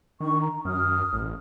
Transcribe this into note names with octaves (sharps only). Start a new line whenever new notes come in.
D#3 D4 C#6
A#5
F#2 D#6 F6
A1